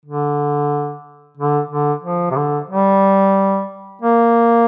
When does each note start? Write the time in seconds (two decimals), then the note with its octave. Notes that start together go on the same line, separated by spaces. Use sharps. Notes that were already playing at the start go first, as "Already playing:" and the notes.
0.06 D3
1.37 D3
1.70 D3
2.03 F3
2.31 C3
2.36 D3
2.70 G3
4.01 A#3